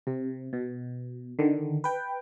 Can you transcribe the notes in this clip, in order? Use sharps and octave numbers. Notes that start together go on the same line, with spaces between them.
C3
B2
D3 D#3
B4 G5